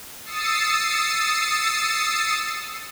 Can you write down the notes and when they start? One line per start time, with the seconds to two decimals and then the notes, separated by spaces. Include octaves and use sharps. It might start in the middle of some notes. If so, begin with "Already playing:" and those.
0.25 D#6 E6 A6 C7 C#7